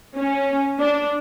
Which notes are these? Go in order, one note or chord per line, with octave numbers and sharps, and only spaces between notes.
C#4
D4